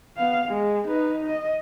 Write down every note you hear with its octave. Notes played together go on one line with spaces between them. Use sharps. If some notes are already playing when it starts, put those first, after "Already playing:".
B3 F5
G#3
D#4 B4
D#5